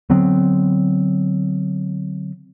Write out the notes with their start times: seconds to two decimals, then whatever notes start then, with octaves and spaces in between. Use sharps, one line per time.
0.10 D3 F#3 B3 C4